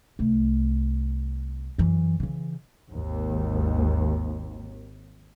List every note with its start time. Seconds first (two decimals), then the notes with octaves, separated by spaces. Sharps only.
0.19 C2 A3
1.78 F#2 E3
2.20 C#3 E3
2.89 G#1 D#2